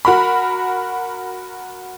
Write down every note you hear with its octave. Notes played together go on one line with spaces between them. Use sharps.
F#4 A#4 B5